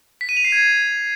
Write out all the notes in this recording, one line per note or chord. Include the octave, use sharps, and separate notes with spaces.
B6
D#7
F7
C7
G#6